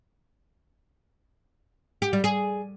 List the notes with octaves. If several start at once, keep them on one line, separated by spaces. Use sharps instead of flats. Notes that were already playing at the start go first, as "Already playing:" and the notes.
G4
G3
G#4